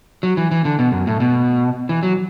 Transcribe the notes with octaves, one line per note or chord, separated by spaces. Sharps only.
F#3
E3
E3
D3
B2
F#2
A2
B2
E3
F#3